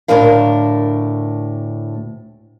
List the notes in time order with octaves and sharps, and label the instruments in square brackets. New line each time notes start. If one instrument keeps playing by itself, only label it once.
[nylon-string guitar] D2 A2 F3 D4 A#4 F5